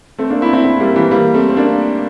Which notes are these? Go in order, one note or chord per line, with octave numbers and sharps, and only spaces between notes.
A3 C4
A#3 D4
C4 E4
C4 E4
C4 E4
G3 A#3
E3 G3
G3 A#3
A3 C4
C4
A#3 D4